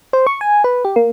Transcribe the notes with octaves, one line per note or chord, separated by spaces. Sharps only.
C5
C#6
G#5
B4
G4
A#3